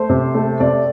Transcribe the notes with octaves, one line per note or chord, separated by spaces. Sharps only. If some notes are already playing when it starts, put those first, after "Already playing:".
Already playing: A3 C5
C3
A3
C3 D5